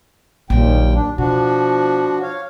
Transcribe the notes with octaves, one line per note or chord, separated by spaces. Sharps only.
A#1 D#2 A#2 F#3 G5
D4
B2 F3 D4 F#4
C#5 F5